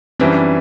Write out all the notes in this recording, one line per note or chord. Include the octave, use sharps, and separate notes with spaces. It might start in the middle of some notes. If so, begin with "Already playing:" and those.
F#2 E3 G3 C4 D4